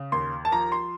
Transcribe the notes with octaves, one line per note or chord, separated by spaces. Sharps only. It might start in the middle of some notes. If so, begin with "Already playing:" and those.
Already playing: C#3
D#2 C6
A5
F3 A#5
C6